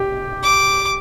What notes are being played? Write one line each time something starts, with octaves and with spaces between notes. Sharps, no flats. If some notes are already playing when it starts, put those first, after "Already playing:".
Already playing: G4
D6